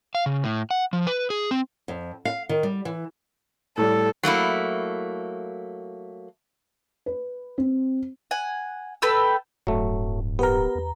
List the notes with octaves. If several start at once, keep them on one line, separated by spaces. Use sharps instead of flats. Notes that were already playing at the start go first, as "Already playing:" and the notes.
F5
C#3
A2
F#5
F3
B4
G#4
C4
F2
F5
D#3
G3
E3
A2 G3 A4
F#3 A3 A#3 E4
B4
C4
F#5 G#5
A4 B4 G5 E6
D1 G2 F#3 A3
B3 G4 A#4 B4 A#5
E2